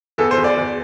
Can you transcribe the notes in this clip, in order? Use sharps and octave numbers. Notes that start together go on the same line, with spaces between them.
E2 A4
C5
E2
D5
E2